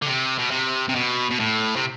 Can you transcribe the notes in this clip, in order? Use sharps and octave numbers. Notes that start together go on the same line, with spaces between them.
D3
C3
B2
C3
C3
B2
B2
A2
C3